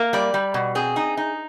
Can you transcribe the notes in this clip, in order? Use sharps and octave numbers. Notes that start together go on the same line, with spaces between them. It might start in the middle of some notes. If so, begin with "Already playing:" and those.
Already playing: A#3
G3 D5
G3
B2
C4 G#4
D#4
D#4